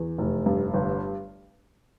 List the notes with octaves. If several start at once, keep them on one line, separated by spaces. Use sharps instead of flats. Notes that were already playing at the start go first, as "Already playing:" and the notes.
Already playing: E2 E3
F1
G2
G1